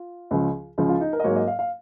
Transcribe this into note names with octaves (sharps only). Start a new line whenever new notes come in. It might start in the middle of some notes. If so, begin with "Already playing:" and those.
Already playing: F4
C#2 C#3 F3
C#2 C#3 F3
F4
D#4
A#4
D#5
G#2 F#3 A#3 C#5
D#5
F5
F5